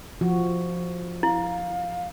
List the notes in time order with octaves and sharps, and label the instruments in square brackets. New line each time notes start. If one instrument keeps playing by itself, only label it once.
[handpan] F3 F#4
[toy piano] E4 [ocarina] F5